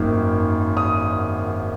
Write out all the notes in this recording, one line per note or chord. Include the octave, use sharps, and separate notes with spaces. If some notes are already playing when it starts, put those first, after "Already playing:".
Already playing: G#1 F#2 D#3 F#3 A#3
D#6